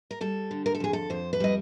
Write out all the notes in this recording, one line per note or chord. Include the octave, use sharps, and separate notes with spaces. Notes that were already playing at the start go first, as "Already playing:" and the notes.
A#4
G3 A4
D3
A#4
A4
F2 G#4
A4
F2 C5
B4
G3 D#5